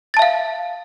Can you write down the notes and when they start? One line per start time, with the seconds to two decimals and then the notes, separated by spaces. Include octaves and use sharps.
0.14 A6
0.17 A5
0.19 E5
0.22 F5